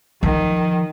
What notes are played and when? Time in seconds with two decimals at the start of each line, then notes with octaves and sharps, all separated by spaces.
0.23 D#3 F3